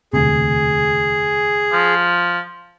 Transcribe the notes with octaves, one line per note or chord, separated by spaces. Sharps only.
E1 D2 C3 G#4
F3